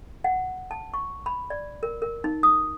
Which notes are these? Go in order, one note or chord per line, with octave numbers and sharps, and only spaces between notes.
F#5
A5
C#6
B5
D5
A#4
A#4
D#4
D#6